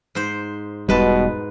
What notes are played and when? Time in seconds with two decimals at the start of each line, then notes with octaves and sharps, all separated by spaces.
0.15 G#2 C5
0.89 E1 G#2 B2 G3 B4 A5